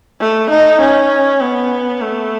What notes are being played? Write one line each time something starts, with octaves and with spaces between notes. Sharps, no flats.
A3
D#4
C#4
B3
A3